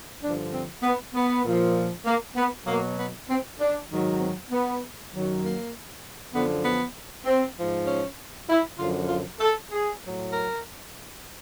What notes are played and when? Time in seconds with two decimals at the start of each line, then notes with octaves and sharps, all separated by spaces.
0.22 G2 D3 F3 D4
0.53 C4
0.83 B3
1.14 B3
1.45 A#2 F3
2.05 A#3
2.36 B3
2.66 B2 F#3 A#3
2.98 B3
3.28 C4
3.58 D4
3.89 G#2 D#3 F#3
4.20 C4
4.50 B3
5.12 F#2 D#3 F#3
5.42 A#3
6.33 F#2 D3 F3 B3
6.65 B3
7.25 C4
7.56 G#2 F3
7.87 C#4
8.49 E4
8.79 F#2 D3 F3 F4
9.09 F4
9.40 A4
9.71 G#4
10.01 A2 F#3
10.31 A#4